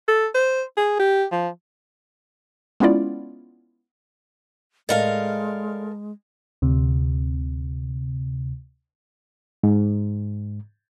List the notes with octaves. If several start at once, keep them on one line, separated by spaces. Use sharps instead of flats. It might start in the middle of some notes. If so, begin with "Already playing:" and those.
A4
C5
G#4
G4
F3
G#3 B3 C#4 E4 F4 D5
A2 G#3 A4 A#4 D5 D#5 F5
D2 C3
G#2